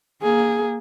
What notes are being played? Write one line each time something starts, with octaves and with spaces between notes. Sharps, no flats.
A#3 G#4